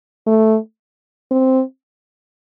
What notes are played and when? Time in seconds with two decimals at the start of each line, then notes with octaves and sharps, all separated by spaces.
0.27 A3
1.31 C4